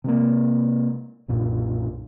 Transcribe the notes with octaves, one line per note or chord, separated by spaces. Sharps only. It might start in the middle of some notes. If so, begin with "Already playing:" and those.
C3 G#3 A#3
B1 F#2 A#2